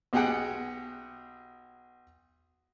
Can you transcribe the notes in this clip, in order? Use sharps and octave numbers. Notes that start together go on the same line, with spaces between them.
B1 B2 G4 G#4 F#5 G5